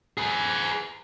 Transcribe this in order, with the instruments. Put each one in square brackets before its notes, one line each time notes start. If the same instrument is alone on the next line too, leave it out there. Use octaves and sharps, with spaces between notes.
[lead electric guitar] G#4 B4